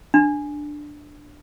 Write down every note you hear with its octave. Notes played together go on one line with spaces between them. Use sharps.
D4